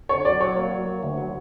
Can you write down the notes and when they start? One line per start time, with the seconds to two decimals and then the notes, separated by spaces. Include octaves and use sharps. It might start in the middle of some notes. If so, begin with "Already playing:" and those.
0.09 D3 C#5
0.25 F#3 D5
0.40 F#3 C#5
0.56 A#3
0.71 F#3
0.86 A#3
1.03 D2
1.17 F#3